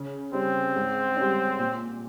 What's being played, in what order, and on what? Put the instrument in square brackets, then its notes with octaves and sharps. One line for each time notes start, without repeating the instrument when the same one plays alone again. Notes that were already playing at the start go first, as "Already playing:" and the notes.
Already playing: [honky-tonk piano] C#3
[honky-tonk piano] G3 C#4 [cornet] C4
[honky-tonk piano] G#2
G3 C#4
A#2